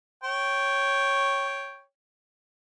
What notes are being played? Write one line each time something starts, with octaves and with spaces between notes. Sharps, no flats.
C#5 G5